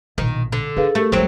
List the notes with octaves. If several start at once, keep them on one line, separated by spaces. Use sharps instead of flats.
A#1 B2 D#3
D3
D4 G#4 B4 F5
A3 G4 A#4
C#2 F#3 G3 C4 C5 C#5